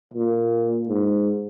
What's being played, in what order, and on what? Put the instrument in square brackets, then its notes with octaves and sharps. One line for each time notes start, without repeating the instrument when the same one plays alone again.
[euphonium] A#2
G#2